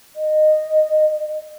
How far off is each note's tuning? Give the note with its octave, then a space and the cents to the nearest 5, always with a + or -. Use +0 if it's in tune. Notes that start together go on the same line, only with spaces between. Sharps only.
D#5 -15